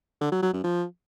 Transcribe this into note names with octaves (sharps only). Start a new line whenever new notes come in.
D3
F#3
F#3
F#2
F3